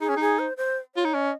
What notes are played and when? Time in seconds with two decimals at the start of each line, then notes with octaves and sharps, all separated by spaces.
0.01 D#4 G#4
0.09 C#4
0.17 D#4 G#4
0.39 C5
0.57 C5
0.95 F4 C#5
1.05 D#4
1.14 C#4 D#5